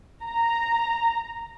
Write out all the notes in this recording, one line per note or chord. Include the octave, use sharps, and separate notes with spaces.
A#5